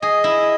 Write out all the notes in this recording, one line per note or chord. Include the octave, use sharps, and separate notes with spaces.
G#4 D#5
E4